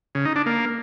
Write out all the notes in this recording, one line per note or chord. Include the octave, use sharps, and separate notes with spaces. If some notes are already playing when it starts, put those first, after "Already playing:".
C#3
D#4
D4
A#3